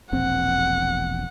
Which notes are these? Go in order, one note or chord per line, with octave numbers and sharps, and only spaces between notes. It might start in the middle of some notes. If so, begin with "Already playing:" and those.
E1 A#1 C4 F#5